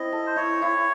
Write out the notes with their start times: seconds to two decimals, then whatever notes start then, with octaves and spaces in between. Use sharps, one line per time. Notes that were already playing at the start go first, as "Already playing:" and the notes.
Already playing: C4 E4 D#5
0.12 A4
0.26 C5
0.36 E4 C#5
0.62 E4